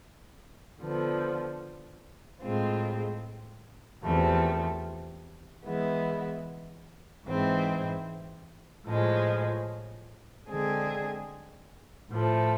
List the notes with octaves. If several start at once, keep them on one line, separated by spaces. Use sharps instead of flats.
D3 F3 B3
A2 G#3 C4 F4
E2 C3 F3 A3
E3 G#3 B3 E4
G#2 E3 G#3 C4 E4
A2 F3 G#3
D3 G#3 C4 G#4
A2 F3 A3